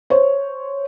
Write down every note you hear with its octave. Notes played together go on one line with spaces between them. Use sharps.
C5 C#5